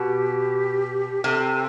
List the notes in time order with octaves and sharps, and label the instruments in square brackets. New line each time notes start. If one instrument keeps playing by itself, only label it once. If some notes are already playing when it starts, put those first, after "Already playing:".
Already playing: [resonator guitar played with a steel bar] B2 [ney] G4
[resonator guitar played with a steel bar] C3 [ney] A4